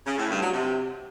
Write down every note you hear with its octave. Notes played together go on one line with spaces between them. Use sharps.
C#3
A2
G2
F#3
C3